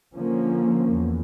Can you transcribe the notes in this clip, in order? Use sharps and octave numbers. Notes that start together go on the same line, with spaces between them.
D3 F3 A#3 C#4
E2